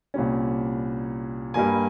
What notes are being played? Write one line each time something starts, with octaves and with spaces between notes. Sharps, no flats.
C2 A#2 G3 C#4
G2 G3 A#3 G#5